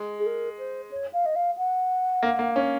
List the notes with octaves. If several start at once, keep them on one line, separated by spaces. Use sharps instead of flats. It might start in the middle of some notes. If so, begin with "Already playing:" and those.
Already playing: G#3
G#4
A#4
C5
C#5
F5
D#5
F5
F#5
A#3
A#3
C#4